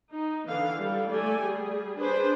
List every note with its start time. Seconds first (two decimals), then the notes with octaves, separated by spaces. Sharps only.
0.12 D#4
0.47 D3 E3 F5
0.80 G3 A4
1.10 A3 D5 G#5
1.42 G3 G#4
1.98 D4 G#4 B4 C5